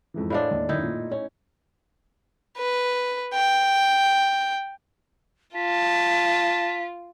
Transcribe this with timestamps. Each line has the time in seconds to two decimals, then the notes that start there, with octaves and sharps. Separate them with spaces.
0.14 F2 G#2 E3
0.30 A2 G#3 D4 C5 F5 B5
0.51 D#2
0.69 F#2 D#3 D#4 E4
0.83 A#2
1.11 C#4 C#5
2.57 B4
3.34 G5
5.55 F4 A5 B6